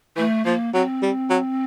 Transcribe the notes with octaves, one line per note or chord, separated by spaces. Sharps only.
E3 A3
F3 A#3
F#3 C4
G3
F#3